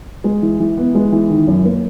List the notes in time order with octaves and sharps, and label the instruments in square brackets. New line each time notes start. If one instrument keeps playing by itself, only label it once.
[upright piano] G#3
E3
E3
B3
G#3
E3
D#3
F#2
A#3